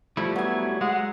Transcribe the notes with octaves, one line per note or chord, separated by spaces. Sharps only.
F3 G3 A3 E4
F#3 B3 G#5
G#3 F#5